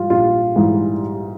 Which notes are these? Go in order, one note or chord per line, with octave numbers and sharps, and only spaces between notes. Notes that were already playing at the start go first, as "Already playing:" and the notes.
Already playing: G#2 E3 G3 F4
A#1 F4
G#2 E3 G3